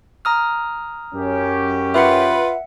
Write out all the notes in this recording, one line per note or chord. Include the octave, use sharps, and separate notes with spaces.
A#5 D#6 F6
F#2 C#4 G4
F4 B4 E5 F#5